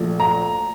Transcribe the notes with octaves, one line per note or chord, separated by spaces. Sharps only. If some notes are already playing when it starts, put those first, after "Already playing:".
Already playing: A#1 A#2 A3
A#5